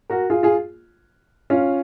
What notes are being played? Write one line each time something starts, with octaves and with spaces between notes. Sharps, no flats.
F#4 A#4
F4 G#4
F4 G#4
C#4 F4